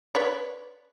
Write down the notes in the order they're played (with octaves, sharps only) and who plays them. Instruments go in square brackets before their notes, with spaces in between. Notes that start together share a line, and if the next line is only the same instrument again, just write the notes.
[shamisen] B4 C#5 D5